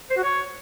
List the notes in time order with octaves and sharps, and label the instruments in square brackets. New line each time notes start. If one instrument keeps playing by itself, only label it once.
[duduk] C5
F#4
C#5